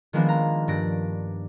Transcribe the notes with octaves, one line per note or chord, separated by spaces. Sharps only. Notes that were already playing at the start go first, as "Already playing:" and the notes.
D#3 F3 G#3 A#3 B3 D4
A#5
G2 D4 A#6 D7